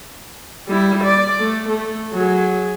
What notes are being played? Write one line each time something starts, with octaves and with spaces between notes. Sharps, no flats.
G3 E4
D5
A3
A3
F#3 G#4